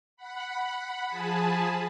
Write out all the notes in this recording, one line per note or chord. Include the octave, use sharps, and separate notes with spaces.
F#5 B5
F3 G#4 G#5 A5 B5